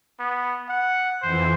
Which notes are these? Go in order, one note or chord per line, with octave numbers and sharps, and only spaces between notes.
B3
F#5
F2 E3 C5